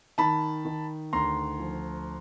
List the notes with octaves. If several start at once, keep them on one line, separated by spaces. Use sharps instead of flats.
D#3 A5 B5
D#3
D2 A#5 C6
F3